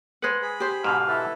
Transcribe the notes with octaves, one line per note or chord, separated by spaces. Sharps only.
G#3 B4 C5 F#5
G#4 B5
G4 C5
G#2 B2 D3 F5
E4 A4 B4